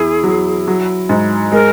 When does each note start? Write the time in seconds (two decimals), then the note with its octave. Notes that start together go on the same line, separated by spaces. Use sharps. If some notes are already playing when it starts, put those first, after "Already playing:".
Already playing: E2 E4 G#4
0.24 F#3
0.68 F#3
1.09 G#2
1.52 G#3 A#4